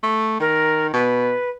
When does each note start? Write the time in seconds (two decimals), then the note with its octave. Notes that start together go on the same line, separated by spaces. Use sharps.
0.03 A3
0.40 D#3 A#4
0.93 B2 B4